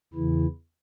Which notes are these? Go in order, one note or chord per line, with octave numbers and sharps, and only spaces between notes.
E2 C#3 E3 E4